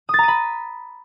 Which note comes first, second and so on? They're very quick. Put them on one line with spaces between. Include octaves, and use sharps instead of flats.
D#6 A6 A#5 D#7 B5